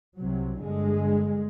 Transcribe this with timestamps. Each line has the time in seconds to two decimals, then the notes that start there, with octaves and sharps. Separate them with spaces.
0.18 C2 C3 F#3
0.63 G1 G2 D3 G#3